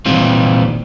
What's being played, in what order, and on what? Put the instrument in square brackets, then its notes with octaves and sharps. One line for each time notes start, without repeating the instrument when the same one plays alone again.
[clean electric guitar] A#2 D#3 E3 G3 C4 F4